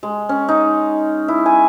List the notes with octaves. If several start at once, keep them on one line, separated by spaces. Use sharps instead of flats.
G#3
C#4
D#4
E4
G#5